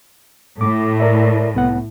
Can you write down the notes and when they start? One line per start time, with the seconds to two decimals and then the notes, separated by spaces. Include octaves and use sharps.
0.61 A2 D6
1.00 A#4 D5 E5
1.55 C2 B3 F#5